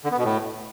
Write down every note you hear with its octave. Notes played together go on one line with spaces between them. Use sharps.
D3
B3
B2
A2